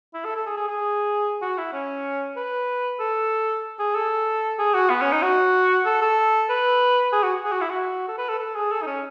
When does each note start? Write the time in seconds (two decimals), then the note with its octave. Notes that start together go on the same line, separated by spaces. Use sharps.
0.14 E4
0.25 A4
0.36 A4
0.46 G#4
0.57 G#4
0.68 G#4
1.42 F#4
1.58 E4
1.73 C#4
2.37 B4
3.00 A4
3.79 G#4
3.95 A4
4.59 G#4
4.74 F#4
4.90 B3
5.02 C#4
5.12 D#4
5.23 F#4
5.85 A4
6.02 A4
6.50 B4
7.13 G#4
7.23 F#4
7.45 G#4
7.52 F#4
7.61 E4
7.70 F#4
8.08 A4
8.18 B4
8.29 A4
8.39 A4
8.55 G#4
8.71 A4
8.83 D#4
8.87 C#4